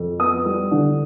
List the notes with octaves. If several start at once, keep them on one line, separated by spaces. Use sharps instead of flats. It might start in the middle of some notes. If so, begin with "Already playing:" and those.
Already playing: F2
B3 D#6
G3
D3